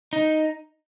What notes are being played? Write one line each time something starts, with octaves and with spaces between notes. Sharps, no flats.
D#4